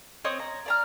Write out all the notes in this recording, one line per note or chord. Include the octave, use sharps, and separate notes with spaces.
C4 C#5 D#5 D#6
A#5
D5 A#5 F6